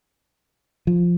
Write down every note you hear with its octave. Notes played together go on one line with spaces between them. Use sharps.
F3